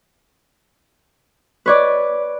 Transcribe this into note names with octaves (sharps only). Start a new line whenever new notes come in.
B4 C#5 D5